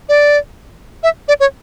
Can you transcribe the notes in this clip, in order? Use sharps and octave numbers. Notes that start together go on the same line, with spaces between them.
D5
E5
D5
C#5